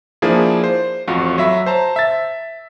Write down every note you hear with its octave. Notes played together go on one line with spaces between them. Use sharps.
F3 A#3 D4 E4 G#4
C5
A1 F2 F4 F#4
F#3 E5 B5
C5 A5 A#5
E5 A6